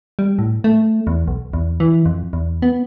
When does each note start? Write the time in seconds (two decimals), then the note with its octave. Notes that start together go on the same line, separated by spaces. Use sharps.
0.19 G3
0.39 A2
0.64 A3
1.07 E2
1.28 B1
1.54 E2
1.80 E3
2.06 F2
2.33 E2
2.62 B3